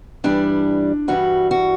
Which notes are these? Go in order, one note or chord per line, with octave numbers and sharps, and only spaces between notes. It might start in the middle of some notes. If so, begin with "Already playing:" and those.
G2 E3 G3 D4
G2 E3 G3 F#4
F#4